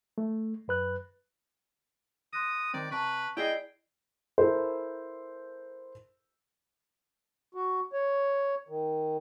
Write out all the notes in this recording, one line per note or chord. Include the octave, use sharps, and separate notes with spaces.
A3
F#2 B4 F#6
C6 D#6 F#6 A#6
D#3 C4 D5
C3 B4 A5 C#6
E4 G#4 D5 D#5 G5 C7
E4 A4 A#4 C5
F#4
C#5
D#3